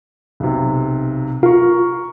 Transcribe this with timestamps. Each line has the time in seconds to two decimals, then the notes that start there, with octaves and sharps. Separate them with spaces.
0.40 B1 C3
1.43 F4 A#4 C#6